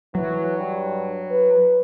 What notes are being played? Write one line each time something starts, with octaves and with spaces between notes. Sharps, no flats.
E3 F#3
G2
B4